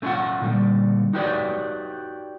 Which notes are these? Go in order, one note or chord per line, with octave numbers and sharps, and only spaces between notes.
A3 C#4 D4 E4 F4 F#5
A#2 D3 G3
D#4 F#4 G4 B4 C#5 D5